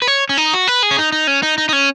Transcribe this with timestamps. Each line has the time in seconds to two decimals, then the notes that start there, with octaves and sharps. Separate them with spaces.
0.02 B4
0.08 C#5
0.29 C#4
0.37 D#4
0.53 F#4
0.68 B4
0.83 G#4
0.91 C#4
0.99 D#4
1.12 D#4
1.27 C#4
1.43 D#4
1.58 D#4
1.69 D#4
1.73 C#4